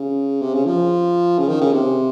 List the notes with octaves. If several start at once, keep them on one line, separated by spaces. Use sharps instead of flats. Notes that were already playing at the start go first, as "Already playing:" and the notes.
Already playing: C#3
C3
C#3
F3
C#3
D#3
C#3
C3